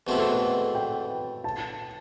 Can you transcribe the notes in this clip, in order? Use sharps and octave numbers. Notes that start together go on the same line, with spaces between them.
E2 B2 A3 C4 E4 B4
A4
B4
G5
A5